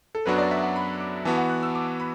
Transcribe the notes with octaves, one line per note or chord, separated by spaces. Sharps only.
A4
F#2 F#3 B3 D4 F#4 B4
D5
E5
F#5
B5
D6
E3 B3 F#4 A5
F#5
F#6
E6
D6
B5